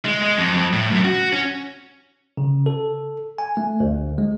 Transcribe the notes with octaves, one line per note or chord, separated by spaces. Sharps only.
G#3
G#3
F2
F2
A2
F#2
F#4
C#4
C#3
A4
G#5
A3
D2
G#3